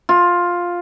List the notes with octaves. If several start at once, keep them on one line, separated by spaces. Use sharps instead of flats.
F4